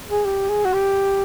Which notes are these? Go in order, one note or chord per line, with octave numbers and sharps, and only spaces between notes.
G#4
G4
G#4
F#4
G4